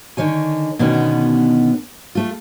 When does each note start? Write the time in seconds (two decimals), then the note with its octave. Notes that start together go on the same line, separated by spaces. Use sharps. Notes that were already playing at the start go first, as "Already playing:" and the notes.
0.17 D3 D#3 C#5 G#5
0.79 B2 D3 D#3 B3 C#4
2.15 A3 F4